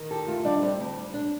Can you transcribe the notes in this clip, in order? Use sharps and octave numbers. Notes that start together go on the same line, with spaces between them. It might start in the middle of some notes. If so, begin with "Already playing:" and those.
Already playing: D#3
G4 A4
A3 F4
G3 D4
G3 C4
D2
G3
D4